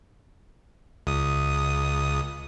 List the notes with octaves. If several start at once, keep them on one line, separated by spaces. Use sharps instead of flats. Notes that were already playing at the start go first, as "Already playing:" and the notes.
C#2 D#6